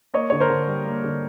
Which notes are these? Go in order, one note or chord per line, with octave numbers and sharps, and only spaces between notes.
A#3 C#5 D#5
D3 C#5
A#4 C5
D3
G3
A#3
D3